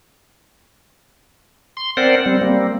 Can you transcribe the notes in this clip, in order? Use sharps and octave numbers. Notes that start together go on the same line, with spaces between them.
C6
C4 A#4 C5 D5 F#5
G3 C4
G3 A#3 C4